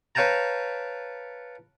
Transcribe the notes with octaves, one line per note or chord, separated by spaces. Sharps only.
B4 C#5 F5 G5 A5 A#5